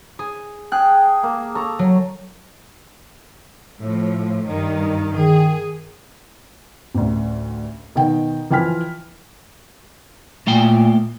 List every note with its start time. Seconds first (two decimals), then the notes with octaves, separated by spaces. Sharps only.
0.19 G#4
0.72 G#4 G5 A5 F#6
1.23 A#3
1.55 A4 A#5 C#6
1.79 F#3
3.78 A2 F3
4.47 G2 D#3
5.17 D#3 G#4
6.95 A1 D2
7.95 B2 D#3 D#4 G5
8.50 E3 F3 G5 G#5 F6 B6
10.47 A#2 A3 A#3 G5